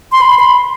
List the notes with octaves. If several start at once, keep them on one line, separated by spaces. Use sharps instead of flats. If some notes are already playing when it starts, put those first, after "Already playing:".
C6
B5
C6
B5